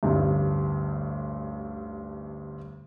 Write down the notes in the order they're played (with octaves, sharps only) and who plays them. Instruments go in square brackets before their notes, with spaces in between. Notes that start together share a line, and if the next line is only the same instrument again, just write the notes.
[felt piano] A1 D2 G2